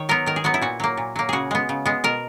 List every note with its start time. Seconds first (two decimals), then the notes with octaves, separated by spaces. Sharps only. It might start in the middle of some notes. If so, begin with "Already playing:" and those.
Already playing: D#3 C#5
0.09 F#3 B3 A#4
0.26 D#3 A#4
0.36 G#4
0.44 F#3 B3 F#4
0.54 E4
0.62 A#2 F#4
0.80 F#3 A#3
0.97 A#2
1.16 F#3 A#3
1.29 C#3 F#4 G#4
1.51 G#3 B3
1.69 C#3
1.86 G#3 B3
2.04 B2 A#4